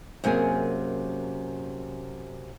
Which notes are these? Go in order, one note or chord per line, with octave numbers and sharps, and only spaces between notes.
F#2 C3 A#3 G#4